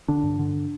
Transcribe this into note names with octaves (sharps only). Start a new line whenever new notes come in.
D3 D4
G2
D3